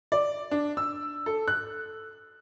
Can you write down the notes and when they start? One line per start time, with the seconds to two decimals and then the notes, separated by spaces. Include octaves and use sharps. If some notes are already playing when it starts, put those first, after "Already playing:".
0.12 D5
0.51 D4
0.77 E6
1.26 A4
1.48 F#6